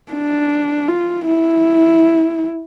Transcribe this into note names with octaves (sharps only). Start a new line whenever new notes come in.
D4
F4
E4